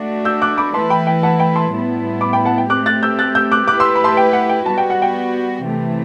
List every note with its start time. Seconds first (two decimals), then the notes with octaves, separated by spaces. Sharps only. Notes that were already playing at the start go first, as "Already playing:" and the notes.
Already playing: A3 D4 F#4
0.25 E6 G6
0.42 D6 F#6
0.57 B5 D6
0.74 E3 A3 E4 B4 A5 C6
0.90 G5 B5
1.07 G5
1.23 F#5 A5
1.39 G5 B5
1.56 A5 C6
1.73 A2 G3 B3 E4
2.21 B5 D6
2.33 G5 B5
2.45 F#5 A5
2.58 G5
2.70 A3 C4 G4 D6 F#6
2.86 F#6 A6
3.03 E6 G6
3.19 F#6 A6
3.35 E6 G6
3.52 D6 F#6
3.67 A3 E4 G4 B4 D6 F#6
3.80 C6 E6
3.95 B5
4.04 A5 C6
4.17 G5
4.33 F#5
4.49 G5
4.66 G3 B3 F#4 A5
4.78 G5
4.90 F#5
5.02 G5
5.64 C3 E3 A3